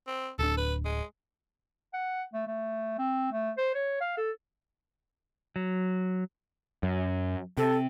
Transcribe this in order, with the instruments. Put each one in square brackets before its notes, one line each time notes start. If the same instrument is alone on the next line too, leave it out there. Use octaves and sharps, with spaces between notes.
[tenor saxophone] C4
[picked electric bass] D1 D4 [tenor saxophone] A4
[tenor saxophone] B4
G#3
[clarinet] F#5
A3
A3
C4
A3
C5
C#5
F5
A4
[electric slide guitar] F#3
[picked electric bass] F#2
[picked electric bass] C3 [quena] A4